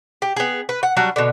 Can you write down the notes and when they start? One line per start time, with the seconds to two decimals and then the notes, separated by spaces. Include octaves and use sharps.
0.22 G4
0.36 B3 G#4
0.69 B4
0.83 F#5
0.97 F#3 G3 D4 F#4
1.16 B2 D3